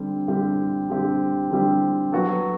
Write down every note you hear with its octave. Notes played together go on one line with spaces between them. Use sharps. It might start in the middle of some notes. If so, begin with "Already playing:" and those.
Already playing: D3 G3 C4 G4
D3 G3 C4 G4
D3 G3 C4 G4
D3 G3 C4 G4
F#3 B3 F#4 A4